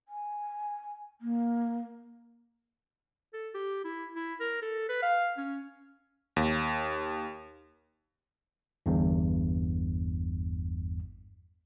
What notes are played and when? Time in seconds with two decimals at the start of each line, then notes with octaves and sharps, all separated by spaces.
0.08 G#5
1.21 A#3
3.34 A4
3.55 G4
3.85 E4
4.15 E4
4.40 A#4
4.62 A4
4.89 B4
5.03 F5
5.38 C#4
6.36 D#2
8.86 G1 E2 G2